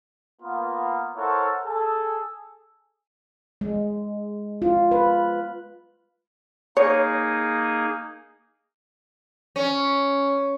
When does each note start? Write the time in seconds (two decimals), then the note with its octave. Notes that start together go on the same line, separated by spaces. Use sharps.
0.42 A#3 B3 F4
1.16 E4 A4 A#4 C5 C#5 F#5
1.64 G#4 A4
3.61 G#3
4.62 F4
4.91 B4
6.77 A#3 D#4 G#4 C#5
9.56 C#4